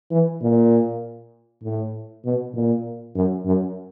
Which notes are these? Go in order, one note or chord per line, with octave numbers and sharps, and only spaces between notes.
E3
A#2
A2
B2
A#2
F#2
F#2